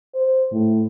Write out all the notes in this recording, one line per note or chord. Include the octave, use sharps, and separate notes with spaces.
C5
A2